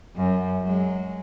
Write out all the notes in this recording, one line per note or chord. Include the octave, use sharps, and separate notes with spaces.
F#2
F#3 G#3